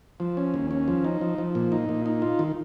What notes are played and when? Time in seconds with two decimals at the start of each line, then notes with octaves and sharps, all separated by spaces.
0.20 F3
0.37 C#4
0.54 D#2
0.71 C#4
0.88 F3
1.04 D#4
1.21 F3
1.38 F3
1.55 A#2
1.72 D#4
1.89 A#2
2.06 D#4
2.22 F4
2.39 D#3